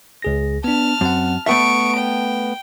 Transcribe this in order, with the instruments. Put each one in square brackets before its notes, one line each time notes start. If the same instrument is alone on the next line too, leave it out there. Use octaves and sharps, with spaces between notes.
[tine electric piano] C#2 G#4 A#6
[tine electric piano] B3 D4 [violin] A5 F6
[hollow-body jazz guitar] F#2 [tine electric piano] C4 F#5
[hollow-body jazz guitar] A3 B3 E5 [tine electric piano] A5 [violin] C#6 D7
[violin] G5